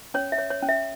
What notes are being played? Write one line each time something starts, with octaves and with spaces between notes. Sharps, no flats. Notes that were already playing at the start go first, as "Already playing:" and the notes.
C#4 C#5
E5
C#5
C#5
C#4
E5